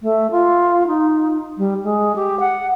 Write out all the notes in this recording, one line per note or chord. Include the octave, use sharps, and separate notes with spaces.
A3
F4
D#4
G3
G#3
G4
F#5